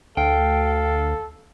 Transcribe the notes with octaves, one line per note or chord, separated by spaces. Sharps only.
D2 A4 F5 G5